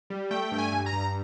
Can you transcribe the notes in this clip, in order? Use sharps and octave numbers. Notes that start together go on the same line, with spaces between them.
G3
A3 G5
G2 G5
G#5
G2
A#5
G2